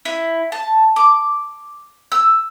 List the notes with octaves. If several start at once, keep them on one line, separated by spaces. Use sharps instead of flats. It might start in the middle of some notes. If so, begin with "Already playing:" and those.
E4
A5
D6
E6